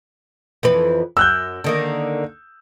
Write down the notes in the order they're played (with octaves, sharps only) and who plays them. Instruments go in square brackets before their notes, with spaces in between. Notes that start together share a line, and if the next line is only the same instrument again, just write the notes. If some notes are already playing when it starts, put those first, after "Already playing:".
[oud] F2 E3 B4
[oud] F#2 [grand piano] E6 F#6 G6
[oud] D3 D#3 A#3